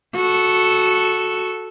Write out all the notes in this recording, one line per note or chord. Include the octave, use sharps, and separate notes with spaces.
F#4 A4